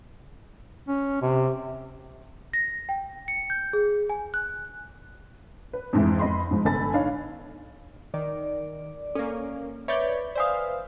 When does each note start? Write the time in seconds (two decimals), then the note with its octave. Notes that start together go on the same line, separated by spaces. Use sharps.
0.88 C#4
1.22 C3
2.53 A#6
2.89 G5
3.28 C#7
3.50 G6
3.73 G#4
4.10 G#5
4.34 F#6
5.73 B4
5.93 F2 G#2 E3
6.19 F2 D#5 B5 C6
6.51 G#2 F3
6.65 G1 A4 G#5 B5 A6
6.94 D4 D#4 C#5 F5
8.14 D#3 D5
9.15 A#3 C#4 A4
9.88 B4 C#5 D5 E5 G6
10.35 C5 D5 E5 F5 G#5 D#6